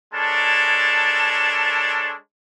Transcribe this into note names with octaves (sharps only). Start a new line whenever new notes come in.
G#3 D4 A4 A#4 C#5 A5